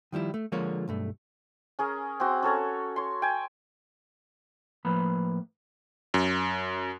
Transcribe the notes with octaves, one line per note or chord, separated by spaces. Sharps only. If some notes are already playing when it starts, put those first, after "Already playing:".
D#3 F3 G3 E4
A3
D3 F3 G#3 A#3 F4 C#5
B1 G2 A3
C#4 G#4 A#4
C4 F#4
C#4 A4 C#5 A#5
C#5 C6
G5 G#5
A2 F3 A#3 B4 B5
F#2